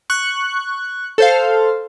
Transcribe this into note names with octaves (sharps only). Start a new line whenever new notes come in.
C#6 F#6
A4 C5 F5